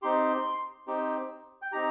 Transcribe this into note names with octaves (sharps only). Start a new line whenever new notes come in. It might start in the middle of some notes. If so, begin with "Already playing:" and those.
C4 D#4 G4 C6
C4 D#4 G4
G5
C4 D#4 G4 A#5